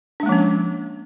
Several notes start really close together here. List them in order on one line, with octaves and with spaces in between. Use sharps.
D4 G#3 A#3 F3 C#4